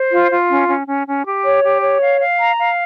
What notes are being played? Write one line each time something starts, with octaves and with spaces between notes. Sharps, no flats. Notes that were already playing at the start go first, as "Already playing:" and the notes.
Already playing: C5
F4
F4
C#4
C#4
C#4
C#4
G4
C#5
G4
C#5
F5
F5
A#5
F5